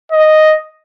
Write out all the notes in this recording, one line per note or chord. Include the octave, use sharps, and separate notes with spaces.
D#5